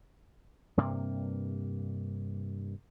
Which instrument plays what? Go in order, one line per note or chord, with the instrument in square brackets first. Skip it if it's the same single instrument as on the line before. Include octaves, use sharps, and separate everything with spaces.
[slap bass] G2 C3 A#3